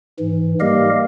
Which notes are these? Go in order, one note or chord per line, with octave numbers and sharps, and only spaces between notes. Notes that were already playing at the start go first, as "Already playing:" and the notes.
G#2 E3
G3 A#3 G4 A#4 D#5 F5